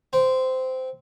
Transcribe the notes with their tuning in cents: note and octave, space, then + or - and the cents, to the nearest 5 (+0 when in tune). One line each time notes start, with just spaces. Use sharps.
C4 -15